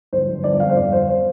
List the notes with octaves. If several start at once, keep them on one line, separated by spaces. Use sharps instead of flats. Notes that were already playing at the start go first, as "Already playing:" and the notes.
G1 C5
G1
G1 D5
F2 F5
C5
G1 D5
G1 C5
C5